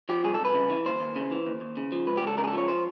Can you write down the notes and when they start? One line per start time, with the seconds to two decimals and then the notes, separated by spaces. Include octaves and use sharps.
0.09 F3 G4
0.24 C2 G#4
0.34 A4
0.40 C2 B4
0.54 C#3
0.70 E3
0.86 D#2 C5
1.00 D#2
1.16 C#3
1.31 E3
1.47 D#2
1.61 D#2
1.77 C#3
1.92 F3
2.07 C#2 B4
2.17 G4
2.22 C#2 A4
2.38 C#3 A#4
2.44 G#4
2.48 A4
2.53 F3 C#5
2.68 C5